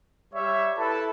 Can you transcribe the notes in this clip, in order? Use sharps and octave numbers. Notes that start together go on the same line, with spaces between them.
G3 C#5 E5
E4 A4 B4 A5